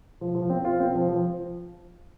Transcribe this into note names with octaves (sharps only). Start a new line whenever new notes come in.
F3
F3
C4
F4
C4
F3
F3